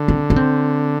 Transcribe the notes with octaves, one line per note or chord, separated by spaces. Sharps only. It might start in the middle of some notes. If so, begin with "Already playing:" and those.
Already playing: D3
C4
C#4
C4